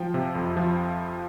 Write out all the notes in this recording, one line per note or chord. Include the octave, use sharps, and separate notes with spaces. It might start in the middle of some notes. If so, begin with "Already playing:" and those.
Already playing: F3 G5
C3
F2
F3